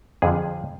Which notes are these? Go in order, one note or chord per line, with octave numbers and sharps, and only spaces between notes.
F2 D3 F3 G#4